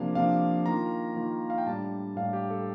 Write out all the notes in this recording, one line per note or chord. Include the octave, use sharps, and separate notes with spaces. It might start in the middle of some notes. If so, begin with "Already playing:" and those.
Already playing: C3 F3 A#3 D4 F5
C3 F3 A#3 D4 F5
D#3 A#3 F4 A#5
D#3 A#3 F4
F5
G5
A2 G3 D4 A5
A2 G3 D4 F5
G4
A4